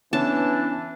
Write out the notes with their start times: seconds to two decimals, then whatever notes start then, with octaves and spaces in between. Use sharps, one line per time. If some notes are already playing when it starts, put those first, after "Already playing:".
0.13 E3 B3 C#4 D4 A5